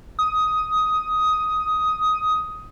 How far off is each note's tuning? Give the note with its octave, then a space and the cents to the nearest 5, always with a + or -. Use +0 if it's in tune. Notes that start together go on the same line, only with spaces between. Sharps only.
D#6 +10